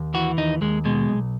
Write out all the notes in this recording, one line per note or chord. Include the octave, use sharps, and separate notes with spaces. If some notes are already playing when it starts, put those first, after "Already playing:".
Already playing: D#2
E3 F#4
D#2 D#4
D#2 G#3
B2 G#3
B1